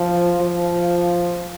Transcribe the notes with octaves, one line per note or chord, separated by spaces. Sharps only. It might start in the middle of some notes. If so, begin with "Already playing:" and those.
Already playing: F3
F3